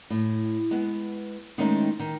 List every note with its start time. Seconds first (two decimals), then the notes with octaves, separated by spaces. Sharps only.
0.10 A2
0.71 G#3 B3
1.58 D#3 G#3 A3 C4 C#4 D#4
2.00 D#3